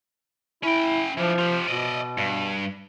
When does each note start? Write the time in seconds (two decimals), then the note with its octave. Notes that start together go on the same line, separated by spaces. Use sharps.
0.63 C#4 E4 G5
1.17 E3 F3 D4
1.38 F4 G4
1.67 B2 D5 D#5
2.18 G2